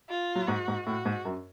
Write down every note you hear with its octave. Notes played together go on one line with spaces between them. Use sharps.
F4
F#3
G#2 F#4
G#2
A2 F#4
G#2
F#2